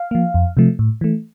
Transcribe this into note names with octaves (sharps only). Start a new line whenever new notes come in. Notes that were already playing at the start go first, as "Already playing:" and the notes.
Already playing: F5
F3 A#3
F2
C3 F3 A3
A2
E3 A3